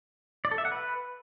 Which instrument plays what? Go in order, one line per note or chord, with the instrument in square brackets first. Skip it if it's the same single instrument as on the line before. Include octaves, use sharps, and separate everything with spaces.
[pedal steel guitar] D5
A4
E5
F#5
B4